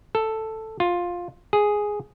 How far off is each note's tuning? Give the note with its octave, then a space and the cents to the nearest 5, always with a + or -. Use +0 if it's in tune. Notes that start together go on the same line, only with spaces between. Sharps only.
A4 +5
F4 +10
G#4 +0